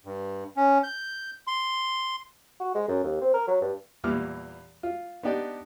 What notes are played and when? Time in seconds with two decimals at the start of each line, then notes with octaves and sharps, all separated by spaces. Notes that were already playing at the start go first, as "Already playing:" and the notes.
0.05 G2
0.57 C#4
0.83 G6
1.47 C6
2.60 F#4
2.75 G#3
2.88 F#2
3.03 D#2
3.21 C4
3.34 A#4
3.48 F#3
3.62 G2
4.04 E2 A#2 E3 G3 D6 F6
4.83 F4
5.23 B3 D4 D#4 G4 D5